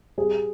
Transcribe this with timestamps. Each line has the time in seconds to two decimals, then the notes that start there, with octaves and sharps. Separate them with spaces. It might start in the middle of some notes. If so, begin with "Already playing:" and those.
0.18 G3 G#4